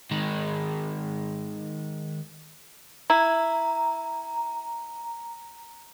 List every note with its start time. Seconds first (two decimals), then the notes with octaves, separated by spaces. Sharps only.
0.11 D#3 G#3
3.10 E4 A#5